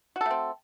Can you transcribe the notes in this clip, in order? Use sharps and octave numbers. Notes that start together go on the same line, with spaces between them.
A3 C4 F#4 A4